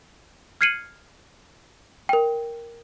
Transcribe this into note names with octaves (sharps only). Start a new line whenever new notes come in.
F6 G#6 C7 C#7 D#7 F#7
A#4 G5